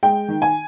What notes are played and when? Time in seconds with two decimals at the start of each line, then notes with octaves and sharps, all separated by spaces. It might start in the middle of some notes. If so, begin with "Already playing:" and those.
0.03 G#3 G5
0.28 D#3
0.42 G#5